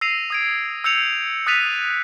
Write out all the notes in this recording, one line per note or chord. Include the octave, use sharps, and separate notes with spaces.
E6 A#6 C7 D#7 F7
D#6 G#6 D7
E6 G6 C#7 F7
D#6 F#6 A6 B6 D#7 F7